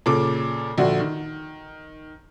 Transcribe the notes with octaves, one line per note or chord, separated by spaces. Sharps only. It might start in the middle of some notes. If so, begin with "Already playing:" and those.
A#2 C#3 A4 D6
A#1 D3 F#4
D#3